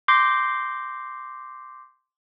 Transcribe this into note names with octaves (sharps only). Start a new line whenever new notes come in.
C6 D6 G6 A#6 C7